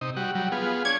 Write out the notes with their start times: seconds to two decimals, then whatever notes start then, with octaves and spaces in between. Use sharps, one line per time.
0.01 C3 D#4
0.16 G3 F#4
0.35 F#3 G3
0.52 B3 F4 G#4
0.85 D4 C#5 G#6